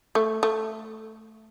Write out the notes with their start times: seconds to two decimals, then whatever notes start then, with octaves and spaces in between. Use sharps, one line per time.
0.15 A3
0.43 A3